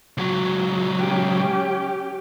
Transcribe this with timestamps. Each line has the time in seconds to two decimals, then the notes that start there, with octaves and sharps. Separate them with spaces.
0.18 C#2 F#3
1.00 C#4 G4